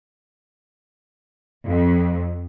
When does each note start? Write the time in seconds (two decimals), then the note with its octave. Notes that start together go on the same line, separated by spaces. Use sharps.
1.66 F2